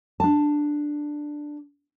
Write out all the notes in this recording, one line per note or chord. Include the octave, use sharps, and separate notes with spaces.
D4 A5